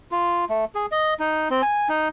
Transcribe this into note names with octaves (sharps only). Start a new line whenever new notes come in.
F4
A3
G#4
D#5
D#4
C4
G#5
D#4